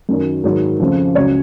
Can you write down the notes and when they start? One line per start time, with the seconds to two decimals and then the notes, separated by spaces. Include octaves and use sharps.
0.09 F#2 D#3 F#3
0.44 G#2 D#3 F#3
0.80 F2 C#3 F3
1.15 C#2 C#3 F#3 C#5